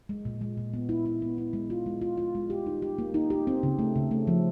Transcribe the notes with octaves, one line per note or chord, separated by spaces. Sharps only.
G#3
A#2
G#3
A#2
B3
E4
E4
B3
E4
G#3
F4
G#3
F4
F4
G#3
G4
D#4
G4
A#3
D#4
G4
C4
C#3
A3
C#3
A3
F3